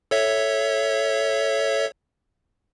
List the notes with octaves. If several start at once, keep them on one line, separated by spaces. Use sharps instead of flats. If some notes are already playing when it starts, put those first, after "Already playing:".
A4 C#5 E5